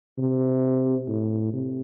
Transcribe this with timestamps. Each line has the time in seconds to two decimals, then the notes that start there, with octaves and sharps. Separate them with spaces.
0.18 C3
1.08 A2
1.53 C3